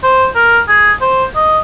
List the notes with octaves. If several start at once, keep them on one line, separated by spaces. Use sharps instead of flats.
C5
A#4
G#4
C5
D#5